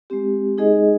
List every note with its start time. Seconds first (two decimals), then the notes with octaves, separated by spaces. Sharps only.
0.10 G#3 C4 G4
0.58 G#3 D#4 G#4 D#5